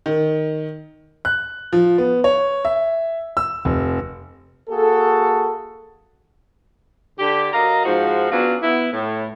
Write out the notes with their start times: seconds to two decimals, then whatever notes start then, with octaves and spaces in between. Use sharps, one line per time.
0.06 D#3
1.25 F#6
1.73 F3
1.98 B3
2.24 C#5
2.65 E5
3.37 E6
3.65 F1
4.70 A#3 F#4 G#4 A4
7.19 D3 G4
7.53 F#3 A#4 D#5 F5 A#5
7.85 G#2 F3 F#4
8.31 F#3 B3 C#4 D4 F4 F#4
8.63 B3 E4
8.92 A2